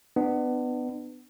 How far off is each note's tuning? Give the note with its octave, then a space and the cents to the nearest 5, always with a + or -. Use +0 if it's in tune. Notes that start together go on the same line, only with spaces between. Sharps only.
B3 +20 D4 +35